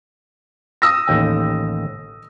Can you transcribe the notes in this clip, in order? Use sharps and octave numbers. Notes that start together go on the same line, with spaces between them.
D#6 E6 A#6
A1 D#2 G5